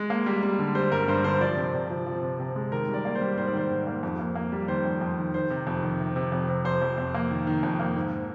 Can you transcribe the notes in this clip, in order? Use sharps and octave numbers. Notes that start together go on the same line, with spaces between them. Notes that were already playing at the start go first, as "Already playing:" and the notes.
Already playing: G#3
A#3
G3
G3
D3
G3 C5
G2 A#4
G2 C5
D3 C5
F3 D5
C3
C3
F3
F3
C3
C3
G#3
D#3 A#4
G3
D5
A#3 D5
C5
G3
G#2 C5
D5
D#3 C5
G#2
A#3
F2
A#3
A#3
G3
D#3 C5
F2
F2
D#3
D#3 C5
C3
F2
D#3
C3
C3
F2
C3
F2 C5
F2
F2
A#3
D#3
D#3
F2
A#3
G#2